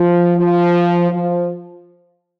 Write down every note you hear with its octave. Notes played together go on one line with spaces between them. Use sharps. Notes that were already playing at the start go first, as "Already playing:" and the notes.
Already playing: F3
F3
F3